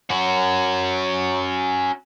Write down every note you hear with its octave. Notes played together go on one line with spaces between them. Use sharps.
C#4 F#4